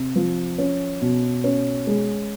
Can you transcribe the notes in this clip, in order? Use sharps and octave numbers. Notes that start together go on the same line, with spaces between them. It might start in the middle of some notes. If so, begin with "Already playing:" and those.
Already playing: C3
F3
C#4
B2
C#4
G#3